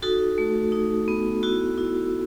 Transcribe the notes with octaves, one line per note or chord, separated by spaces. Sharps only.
D#4 F#4 A4
A3
D#4
B3
E4 F#4
E4